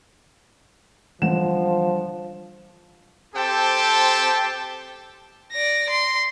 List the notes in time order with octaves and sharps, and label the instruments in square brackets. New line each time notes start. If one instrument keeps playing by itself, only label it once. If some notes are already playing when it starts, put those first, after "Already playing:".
[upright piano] G1 F#5 E7 [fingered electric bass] E3 [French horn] F3
[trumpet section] C4 G4 A4 C5 G5 A5
[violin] D5 A#6
C6